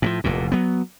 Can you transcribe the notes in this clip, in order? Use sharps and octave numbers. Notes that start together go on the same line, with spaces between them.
A2 E3 F3
F1 E2 A#2
F#3 B3